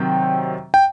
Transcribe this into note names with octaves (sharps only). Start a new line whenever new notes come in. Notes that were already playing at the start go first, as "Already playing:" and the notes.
Already playing: C3 D#3 F#3 C4 G5
G5